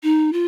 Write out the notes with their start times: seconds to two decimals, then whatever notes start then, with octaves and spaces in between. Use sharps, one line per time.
0.03 D#4
0.33 F4